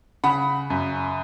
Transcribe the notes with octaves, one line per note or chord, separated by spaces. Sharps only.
C#3 F#5 B5
F#2